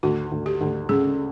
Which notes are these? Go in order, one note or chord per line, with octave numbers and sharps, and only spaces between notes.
D2 F#4
D2
G4
D2
C#3 G#4